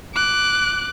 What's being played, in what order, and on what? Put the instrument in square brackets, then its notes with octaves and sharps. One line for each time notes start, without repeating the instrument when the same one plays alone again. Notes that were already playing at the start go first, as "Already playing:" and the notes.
[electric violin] D6 F#6